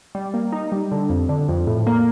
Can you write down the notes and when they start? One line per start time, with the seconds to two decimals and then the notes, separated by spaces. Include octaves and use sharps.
0.15 G3
0.34 A#3
0.52 D#4
0.72 G3
0.92 D3
1.09 F2
1.29 D3
1.49 F2
1.67 A2
1.87 A#3